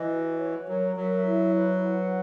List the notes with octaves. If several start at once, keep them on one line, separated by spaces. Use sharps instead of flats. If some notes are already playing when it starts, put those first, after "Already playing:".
Already playing: E3 D#5
F#4
C#5
F#3 A#4
F#3 E5
E4
B4
F#5